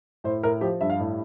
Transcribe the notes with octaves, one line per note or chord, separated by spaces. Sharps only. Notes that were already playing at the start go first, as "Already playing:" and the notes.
A2 C5
A2 A#4
F3 G4
G2 E5
F5
A2